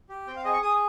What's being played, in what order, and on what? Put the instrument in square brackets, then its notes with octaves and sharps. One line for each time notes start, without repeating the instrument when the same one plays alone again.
[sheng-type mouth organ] G4
C4 G5
F5
G#4 D#5
C#6
G#4 D#6